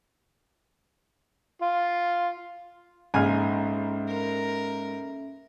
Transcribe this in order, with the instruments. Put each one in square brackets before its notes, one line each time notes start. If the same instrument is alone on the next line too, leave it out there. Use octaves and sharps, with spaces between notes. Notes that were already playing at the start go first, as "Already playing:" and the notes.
[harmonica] F4
[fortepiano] A#1 C#3 G#5 [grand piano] G#2 F6 [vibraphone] C#4 A4 E5
[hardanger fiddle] A#4